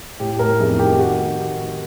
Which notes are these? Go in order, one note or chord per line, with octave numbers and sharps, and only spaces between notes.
A2 G4
A2 A#4
F1 G#4
D#3 G4
G4
F#4